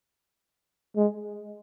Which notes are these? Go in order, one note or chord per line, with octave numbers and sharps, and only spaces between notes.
G#3